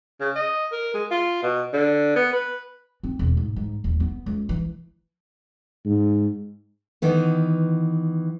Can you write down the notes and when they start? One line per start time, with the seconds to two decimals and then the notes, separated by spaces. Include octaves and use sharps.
0.20 C#3
0.35 D#5
0.72 A#4
0.94 G#3
1.11 F4
1.43 B2
1.73 D3
2.16 B3
2.33 B4
3.03 C4
3.19 E1
3.37 G#2
3.56 G#2
3.84 D#1
4.00 B3
4.26 C#2
4.49 E3
5.85 G#2
7.02 D#3 E3 B3